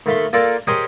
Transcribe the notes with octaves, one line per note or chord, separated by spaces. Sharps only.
D#2 A3 F5 B5 C6
A#3 F4 A4 A#4 D5
G4 G#4 A#4 C5 C#5 D#5